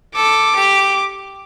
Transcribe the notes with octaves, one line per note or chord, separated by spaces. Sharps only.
A4 D6
G4